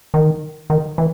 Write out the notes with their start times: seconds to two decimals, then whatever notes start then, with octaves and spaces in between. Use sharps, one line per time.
0.14 D#3
0.70 D#3
0.98 E3